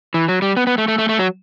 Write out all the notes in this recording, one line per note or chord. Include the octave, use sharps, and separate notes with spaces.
E3
F#3
G3
B3
B3
A3
A3
A3
A3
F#3